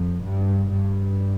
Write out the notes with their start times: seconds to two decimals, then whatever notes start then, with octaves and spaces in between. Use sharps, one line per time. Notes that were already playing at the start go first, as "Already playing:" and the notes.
Already playing: F2
0.23 G2
0.69 G2